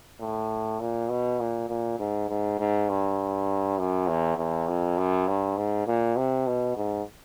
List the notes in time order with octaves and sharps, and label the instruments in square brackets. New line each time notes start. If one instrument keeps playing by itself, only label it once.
[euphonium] A2
A#2
B2
A#2
A#2
G#2
G#2
G#2
G2
F#2
E2
E2
F2
F#2
G2
G#2
A#2
C3
B2
G#2